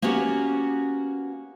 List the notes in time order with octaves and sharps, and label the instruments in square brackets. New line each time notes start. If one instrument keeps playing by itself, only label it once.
[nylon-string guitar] A#3 B3 C#4 F#4 G4